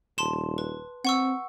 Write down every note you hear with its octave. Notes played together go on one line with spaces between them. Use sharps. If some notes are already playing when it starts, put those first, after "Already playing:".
D#1 A5 C6 E7
B4
C4 F#5 C#6 E6